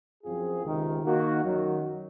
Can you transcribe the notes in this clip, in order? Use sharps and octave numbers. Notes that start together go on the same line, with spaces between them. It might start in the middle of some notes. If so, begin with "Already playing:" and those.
F#2 F3 C4 F4 G#4
C#2 C3 D#3
D#3 A#3 D#4 F#4
F#2 D#3 F#3